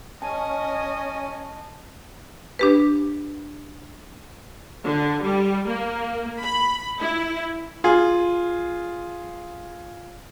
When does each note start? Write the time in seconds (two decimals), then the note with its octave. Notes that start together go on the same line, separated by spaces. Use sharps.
0.22 C#4 D#5 G#5 A5
2.59 D4 G4 B4
4.83 D3
5.21 G3
5.65 A#3
6.41 B5
6.99 E4
7.84 F4 G#4